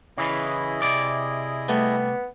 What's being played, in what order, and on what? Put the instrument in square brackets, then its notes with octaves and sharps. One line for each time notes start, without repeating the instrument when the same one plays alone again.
[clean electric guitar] C#3 E3 [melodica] E4 G#4 D#5
[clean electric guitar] C3 D5
[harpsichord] G3 A3 [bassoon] B3